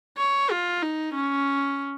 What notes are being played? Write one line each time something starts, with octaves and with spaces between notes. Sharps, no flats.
C#5
F4
D#4
C#4